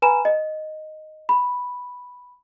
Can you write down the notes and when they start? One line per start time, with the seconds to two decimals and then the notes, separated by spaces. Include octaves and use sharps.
0.02 B4 G#5 A#5 B5 E7
0.25 D#5
1.29 B5